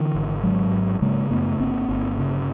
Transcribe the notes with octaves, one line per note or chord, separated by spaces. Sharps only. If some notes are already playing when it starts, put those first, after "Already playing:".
Already playing: D3 E3
G#1
G#2 F#3 G#3
G#1
C#3 G#3 A#3
F#2 A3 B3
G1 A#3 C4
G1
C#3